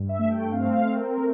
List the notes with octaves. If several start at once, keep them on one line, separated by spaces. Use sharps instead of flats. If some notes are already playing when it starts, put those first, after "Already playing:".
Already playing: G2
E5
A3
G5
C4 F5
F5
C4
A#4
A3